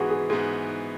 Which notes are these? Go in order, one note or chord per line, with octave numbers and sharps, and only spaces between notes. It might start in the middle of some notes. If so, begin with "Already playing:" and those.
Already playing: G#2 E3 B3 F#4 G#4
G#4
G#2 E3 B3 G#4